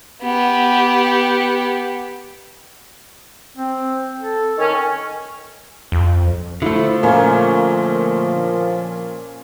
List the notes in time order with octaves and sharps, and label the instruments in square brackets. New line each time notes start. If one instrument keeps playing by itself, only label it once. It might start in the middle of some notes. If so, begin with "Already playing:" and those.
[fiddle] B3 G4
[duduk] C4
A4
[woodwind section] D#3 C#4
[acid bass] F2
[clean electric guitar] D3 A3 [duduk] F3 [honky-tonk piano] E4
[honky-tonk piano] A#2 [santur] A#3 C#4